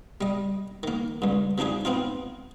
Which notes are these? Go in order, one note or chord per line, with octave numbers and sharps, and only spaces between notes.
G3 D#5
D#3 A#3
C#2 G2
C3 F3 D4 D#4 G#4
B3 C4 D#4 F4